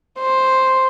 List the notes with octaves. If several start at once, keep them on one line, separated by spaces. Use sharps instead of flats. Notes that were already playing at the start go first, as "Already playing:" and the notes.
C5